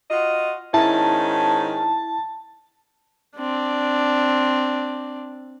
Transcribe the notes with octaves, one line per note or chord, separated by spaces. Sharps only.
F4 F#4 D#5
G#2 D#3 C#4 E4 A5
C4 D4